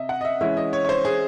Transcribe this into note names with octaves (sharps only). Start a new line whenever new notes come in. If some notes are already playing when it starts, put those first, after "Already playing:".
Already playing: C3 D#5 E5
F#5
D#5
E5
E3 G#3 C#4 E5
D#5
C#5
C#5
C5
G#4